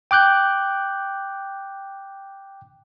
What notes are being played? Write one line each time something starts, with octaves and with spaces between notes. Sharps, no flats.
G5 D6 F#6 G6